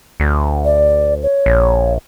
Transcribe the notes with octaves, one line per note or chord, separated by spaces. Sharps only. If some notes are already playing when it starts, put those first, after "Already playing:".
D2
D5
C#5
A#1